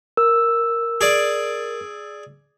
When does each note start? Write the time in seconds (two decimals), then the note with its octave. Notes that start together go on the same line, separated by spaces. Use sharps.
0.17 A#4 E6
1.01 G#4 D5